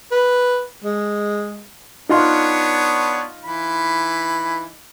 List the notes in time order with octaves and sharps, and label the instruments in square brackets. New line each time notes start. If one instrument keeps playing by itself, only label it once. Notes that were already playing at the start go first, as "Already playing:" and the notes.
[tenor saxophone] B4
G#3
[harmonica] B3 D4 C#5 [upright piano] D#4 F4 C6
[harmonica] E3 B5